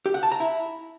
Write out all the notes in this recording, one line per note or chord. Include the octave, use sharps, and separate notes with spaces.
G4
F#5
A5
A#5
E4